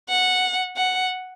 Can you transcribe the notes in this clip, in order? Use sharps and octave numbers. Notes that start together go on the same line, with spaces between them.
F#5
F#5